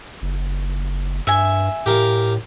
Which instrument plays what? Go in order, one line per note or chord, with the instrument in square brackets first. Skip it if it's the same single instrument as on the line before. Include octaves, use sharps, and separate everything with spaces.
[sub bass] F#1
[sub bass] G2 [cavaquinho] E5 G#5
[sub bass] A2 [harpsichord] G4 A#4 F5